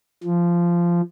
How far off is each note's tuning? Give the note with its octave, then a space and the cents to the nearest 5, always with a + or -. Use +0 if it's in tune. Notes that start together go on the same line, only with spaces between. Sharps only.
F3 -15